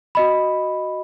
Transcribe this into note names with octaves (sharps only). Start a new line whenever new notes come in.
F#4 D#5 B5